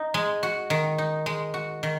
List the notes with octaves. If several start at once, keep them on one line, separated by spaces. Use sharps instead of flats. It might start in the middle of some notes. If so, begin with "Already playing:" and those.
Already playing: D#4
G#3
F#4
D#3
D#4
G#3
F#4
D#3